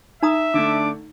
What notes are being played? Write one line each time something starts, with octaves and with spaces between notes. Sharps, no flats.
D#4 E5 A#5 D#6
D3 A3 D4 D6